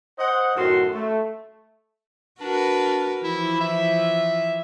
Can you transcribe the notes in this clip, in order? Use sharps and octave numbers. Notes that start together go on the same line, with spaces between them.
C5 D#5 F#5
F#2 A2 D#3 F#4 A4 C6
A3
D4 F#4 A#4 B4
E3 F3 E4
E5